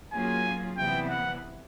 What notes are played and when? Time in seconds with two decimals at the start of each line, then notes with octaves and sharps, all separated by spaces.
0.12 F#3 A#3 C#4 F4 G#4 G#5
0.77 C3 E3 G3 B3 E4 G5
1.10 F#5